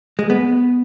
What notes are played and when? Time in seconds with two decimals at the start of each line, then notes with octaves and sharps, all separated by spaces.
0.19 G#3
0.30 B3